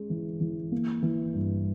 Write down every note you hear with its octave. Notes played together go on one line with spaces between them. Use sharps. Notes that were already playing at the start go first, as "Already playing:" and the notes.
Already playing: G#3 C#4
E3
E3
A#3
E3
G2